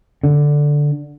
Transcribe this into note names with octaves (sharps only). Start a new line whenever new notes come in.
D3